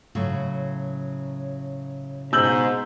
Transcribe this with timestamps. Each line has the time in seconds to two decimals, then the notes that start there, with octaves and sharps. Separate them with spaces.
0.15 A2 C#3 F#3
2.33 G#2 B2 E6 G6 F#7